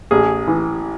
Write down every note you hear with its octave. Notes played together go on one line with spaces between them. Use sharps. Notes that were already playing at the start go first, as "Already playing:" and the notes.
A1 G#4
E3